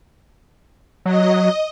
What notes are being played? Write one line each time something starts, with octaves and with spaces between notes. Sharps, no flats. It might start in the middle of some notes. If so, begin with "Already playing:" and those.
F#3 D#5